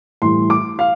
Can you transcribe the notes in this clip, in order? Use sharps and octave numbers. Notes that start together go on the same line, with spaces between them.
A2 E3 G3 C6
D6
F5